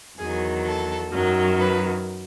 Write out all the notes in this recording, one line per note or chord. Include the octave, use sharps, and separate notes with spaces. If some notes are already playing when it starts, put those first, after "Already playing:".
E2 D#3 F#3 G#4
A4
F#2 D#3 F#3
B4